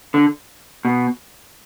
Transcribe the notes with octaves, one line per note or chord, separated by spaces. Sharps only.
D3
B2